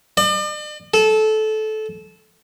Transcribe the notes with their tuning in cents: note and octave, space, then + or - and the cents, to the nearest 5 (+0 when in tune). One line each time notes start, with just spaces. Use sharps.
D5 +45
A4 -20